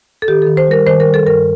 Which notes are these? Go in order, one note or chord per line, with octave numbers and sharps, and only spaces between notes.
A4
D#3 G4
D#3 A4
C5
G3 A#4
D#3 C5
A#4
G3
A4
G2 A#4